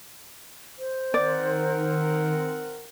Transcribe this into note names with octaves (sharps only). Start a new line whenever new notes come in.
C5
D#3 C4 A#4 D5 F#5